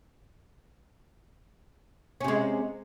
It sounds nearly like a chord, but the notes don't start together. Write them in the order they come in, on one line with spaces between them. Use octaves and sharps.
C#4 C3 G#3